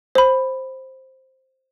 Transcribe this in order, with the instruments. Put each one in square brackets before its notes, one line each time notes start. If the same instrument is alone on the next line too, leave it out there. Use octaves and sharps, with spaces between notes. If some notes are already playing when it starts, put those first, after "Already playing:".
[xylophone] C5 B5